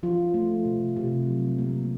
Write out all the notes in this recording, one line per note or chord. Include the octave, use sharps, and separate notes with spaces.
F3 F4
A3
C3
C3
F#3
A#3